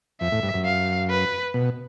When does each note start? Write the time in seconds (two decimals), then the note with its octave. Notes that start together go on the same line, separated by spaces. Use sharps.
0.21 F2 E5
0.32 A2
0.43 G2
0.54 F#2
0.65 F5
1.10 B4
1.54 B2